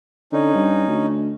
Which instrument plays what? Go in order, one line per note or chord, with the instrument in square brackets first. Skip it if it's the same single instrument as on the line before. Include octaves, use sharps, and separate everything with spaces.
[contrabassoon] D3 [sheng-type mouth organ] C#4 D#4
[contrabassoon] G2
D2